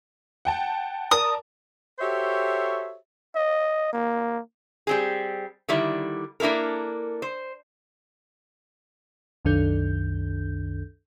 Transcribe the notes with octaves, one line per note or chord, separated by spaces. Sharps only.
F#5 G5 A5
A#4 D5 A5 D#6
F#4 G4 A4 C5 C#5 E5
D#5
A#3
G3 C4 G#4
D3 D#3 G3 E4
A#3 D4 E4 A4 A#4
C5
C2 F#2 D#3 D4 A4 G6